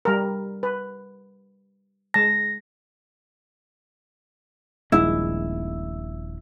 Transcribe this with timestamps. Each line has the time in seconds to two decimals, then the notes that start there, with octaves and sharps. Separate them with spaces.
0.05 G3 A#4
0.63 B4
2.14 G#3 A5 A#6
4.92 D#1 A#1 G#3 E4